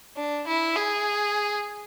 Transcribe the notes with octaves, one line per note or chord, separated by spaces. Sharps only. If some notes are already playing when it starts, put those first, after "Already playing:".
D4
E4
G#4